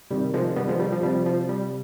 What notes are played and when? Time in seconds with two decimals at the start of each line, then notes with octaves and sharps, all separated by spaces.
0.11 C3 D#3 G3
0.34 F3 G#3
0.56 G3 B3
0.69 F3 G#3
0.79 G3
0.92 F3
1.03 C3 F3 G3
1.26 F3
1.49 G3